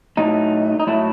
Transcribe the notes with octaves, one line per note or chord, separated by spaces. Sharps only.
A2 F#3 A3 D#4
D#4
A2 F#3 A3 E4